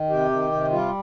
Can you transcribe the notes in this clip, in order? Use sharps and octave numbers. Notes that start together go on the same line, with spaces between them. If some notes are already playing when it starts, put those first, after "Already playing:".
Already playing: D#3
C3 G4
D#3
C3
G3 F4